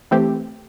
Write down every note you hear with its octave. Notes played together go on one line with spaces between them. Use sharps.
E3 A3 C4 G4